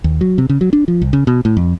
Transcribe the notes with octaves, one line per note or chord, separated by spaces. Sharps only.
D#2
F#3
C3
C#3
F#3
D4
F3
C2
C#3
B2
A2
F2